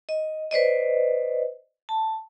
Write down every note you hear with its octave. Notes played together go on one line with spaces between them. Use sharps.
D#5
B4 C5 D5 D#5
A5